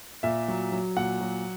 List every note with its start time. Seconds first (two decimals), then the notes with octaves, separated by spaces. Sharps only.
0.23 A#2 E5
0.48 F#3
0.72 F#3
0.97 A#2 F#5
1.21 F#3